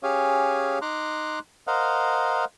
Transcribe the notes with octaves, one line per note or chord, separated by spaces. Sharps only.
C#4 G4 G#4 C#5 F5 G#5
D#4 A#5 C6 D6 F#6
A#4 C5 D#5 F5 F#5